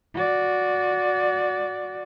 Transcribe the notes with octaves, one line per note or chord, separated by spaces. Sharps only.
F#4 D5